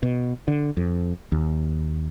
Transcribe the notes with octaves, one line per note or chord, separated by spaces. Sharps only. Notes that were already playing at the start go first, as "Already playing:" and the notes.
B2
D3
F2
D#2